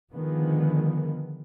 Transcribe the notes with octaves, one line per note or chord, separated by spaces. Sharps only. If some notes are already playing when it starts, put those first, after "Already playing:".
D3 D#3 F3 G#3 B3